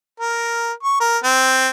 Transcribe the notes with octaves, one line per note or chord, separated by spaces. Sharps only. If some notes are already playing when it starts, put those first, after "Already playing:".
A#4
C#6
A#4
C4